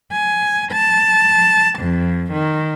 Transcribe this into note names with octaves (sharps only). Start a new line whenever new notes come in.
G#5
A5
F2
D#3